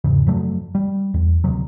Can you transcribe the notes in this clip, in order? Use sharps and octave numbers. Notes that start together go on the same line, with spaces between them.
E2 G#2 C#3 E3
F#2 F3 F#3 A3
G3
E2
D2 C3 F#3